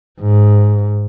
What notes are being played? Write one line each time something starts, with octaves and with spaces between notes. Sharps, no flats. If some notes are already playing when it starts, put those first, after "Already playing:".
G#2